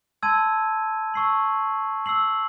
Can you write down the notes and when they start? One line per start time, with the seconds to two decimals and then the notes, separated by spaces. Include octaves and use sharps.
0.23 A5 C6 E6 G#6 D#7
1.14 A5 C#6 E6 C7 F#7
2.06 E6 C7 F#7